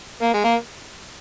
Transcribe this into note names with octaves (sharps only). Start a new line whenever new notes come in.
A#3
G#3
A#3